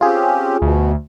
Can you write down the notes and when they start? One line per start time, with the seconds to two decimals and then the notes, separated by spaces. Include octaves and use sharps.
0.01 C4 C#4 F4 G4 G#4
0.62 D2 B2